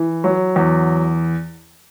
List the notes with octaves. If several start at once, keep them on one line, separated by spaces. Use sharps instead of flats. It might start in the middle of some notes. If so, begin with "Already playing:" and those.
Already playing: E3
F#3
E2